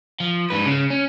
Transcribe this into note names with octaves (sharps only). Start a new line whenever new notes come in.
F3
G#2 B4
C#3
C#4